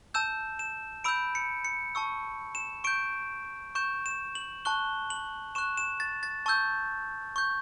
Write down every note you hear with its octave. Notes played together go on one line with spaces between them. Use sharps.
A5 E6 G6 E7
E7
B5 E6 G6 D7
C#7
C#7
A5 C#6 E6
E7
C#6 G6 D7
C#6 G6 E7
E7
F#7
A5 C#6 F#6 G7
F#7
C#6 F#6 E7
E7
A6
A6
A5 C#6 E6 G6
C#6 G6